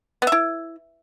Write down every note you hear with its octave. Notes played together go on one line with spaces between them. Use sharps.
B3
E5
E4